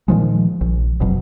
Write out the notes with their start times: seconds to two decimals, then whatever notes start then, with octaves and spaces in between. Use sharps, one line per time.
0.08 A#2 D#3 F3 G#3
0.61 A#1
1.00 E1 F2 B2 F#3